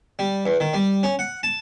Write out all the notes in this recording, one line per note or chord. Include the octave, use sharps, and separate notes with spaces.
G3
E2
D#3
G3
C#4
F#5
A5